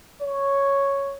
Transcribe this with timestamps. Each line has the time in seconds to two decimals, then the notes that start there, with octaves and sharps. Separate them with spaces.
0.22 C#5